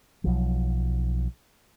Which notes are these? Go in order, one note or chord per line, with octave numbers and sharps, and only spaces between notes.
B1 F3 F#3